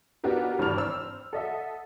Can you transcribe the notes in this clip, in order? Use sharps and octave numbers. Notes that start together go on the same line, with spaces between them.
B3 D4 D#4 F#4 G4 A#4
G#1 G2 E3 D5 F6 F7
C5 E6
A4 D#5 E5 F#5